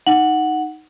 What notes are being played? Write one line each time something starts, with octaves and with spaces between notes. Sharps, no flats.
D#4 F#5 F#7